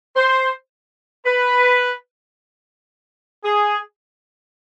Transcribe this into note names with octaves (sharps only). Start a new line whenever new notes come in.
C5
B4
G#4